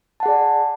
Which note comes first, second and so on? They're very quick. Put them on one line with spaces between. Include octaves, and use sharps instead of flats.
A5 F#5 G#4 D5